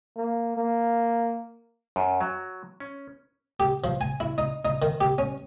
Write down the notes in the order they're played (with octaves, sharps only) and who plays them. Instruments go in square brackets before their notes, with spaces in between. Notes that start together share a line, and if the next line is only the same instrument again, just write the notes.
[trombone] A#3
A#3
[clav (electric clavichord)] F#2
F#3
C#4
[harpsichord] G4
F3
G#5
E4
D#4
D#4
D#3
G4
C#4